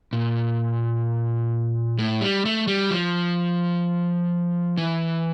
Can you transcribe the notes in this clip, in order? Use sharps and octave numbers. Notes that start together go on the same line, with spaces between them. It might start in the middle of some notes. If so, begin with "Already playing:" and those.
A#2
A2
G3
A3
G3
F3
E3